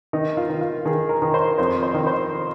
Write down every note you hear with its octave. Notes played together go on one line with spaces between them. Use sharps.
D#3 D#4
F4
D#3
F4
D#3 G#4
A#4
D#3
C5
F2 C5
C5
D#3
C5